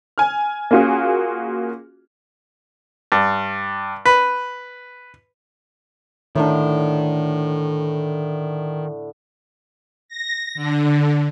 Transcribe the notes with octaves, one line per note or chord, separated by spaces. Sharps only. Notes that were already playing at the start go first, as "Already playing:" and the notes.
G#5 F6
A#3 C#4 F4 F#4 G#4
G2
B4
A2 D3 D#3
A#6
D3